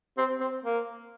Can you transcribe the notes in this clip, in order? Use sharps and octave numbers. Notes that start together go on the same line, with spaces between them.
C4
C4
A#3